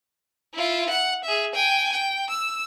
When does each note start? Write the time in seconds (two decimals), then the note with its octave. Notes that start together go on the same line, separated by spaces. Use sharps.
0.54 E4 F4
0.90 F#5
1.24 G#4 E5
1.54 G5 G#5
1.92 G5
2.30 E6